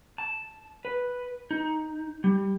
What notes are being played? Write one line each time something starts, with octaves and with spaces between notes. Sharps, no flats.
A5
B4
D#4
G3